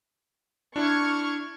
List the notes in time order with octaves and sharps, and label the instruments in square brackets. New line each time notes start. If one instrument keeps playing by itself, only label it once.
[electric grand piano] D4 E4 [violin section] C#6 F6 G#6